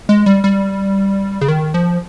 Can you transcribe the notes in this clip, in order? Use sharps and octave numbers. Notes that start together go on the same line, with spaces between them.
G#3
G3
G3
C#3
D#3
F3